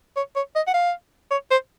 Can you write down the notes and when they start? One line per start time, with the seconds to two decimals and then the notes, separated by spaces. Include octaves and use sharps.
0.16 C#5
0.36 C#5
0.55 D#5
0.67 F#5
0.74 F5
1.31 C#5
1.51 C5